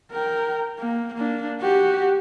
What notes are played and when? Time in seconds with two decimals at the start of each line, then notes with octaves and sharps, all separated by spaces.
0.12 A#4 G5
0.79 A#3
1.14 A#3 D4
1.60 F#4 G4